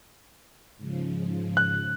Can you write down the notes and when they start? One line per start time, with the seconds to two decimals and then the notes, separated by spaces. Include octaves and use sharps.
0.77 G#2 C#3 F3
1.57 F#6